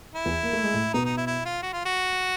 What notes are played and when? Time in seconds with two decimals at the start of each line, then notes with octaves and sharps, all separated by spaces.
0.15 E4
0.26 E2 E3
0.43 A#3
0.53 A3
0.64 G#3
0.74 A2 A3
0.93 B2 B3 D#4
1.05 D#4
1.17 E4
1.27 E4
1.45 F4
1.62 F#4
1.73 F4
1.85 F#4